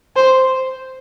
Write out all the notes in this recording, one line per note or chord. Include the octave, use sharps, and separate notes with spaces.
C5